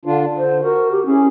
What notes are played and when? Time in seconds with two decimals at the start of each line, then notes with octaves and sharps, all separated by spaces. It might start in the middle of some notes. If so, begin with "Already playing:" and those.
0.05 D3 D4 F4
0.37 D3 C5
0.62 F#4 A#4
0.91 G4
1.06 C#4 E4 G#4